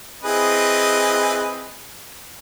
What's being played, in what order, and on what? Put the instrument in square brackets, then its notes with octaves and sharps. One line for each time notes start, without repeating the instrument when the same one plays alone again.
[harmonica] C4 B4 D#5 [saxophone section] E4 G#4